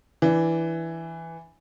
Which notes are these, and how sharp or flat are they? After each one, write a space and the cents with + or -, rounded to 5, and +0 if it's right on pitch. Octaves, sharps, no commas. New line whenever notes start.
E3 +0 D4 -5